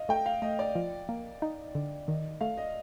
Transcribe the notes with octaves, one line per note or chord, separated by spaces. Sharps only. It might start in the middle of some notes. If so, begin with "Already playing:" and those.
Already playing: D#5 F5
A3 G5
F5
A3 D#5
D5
F3
A#3
D#4
D3
D#3 D#5
A3 F5
D#5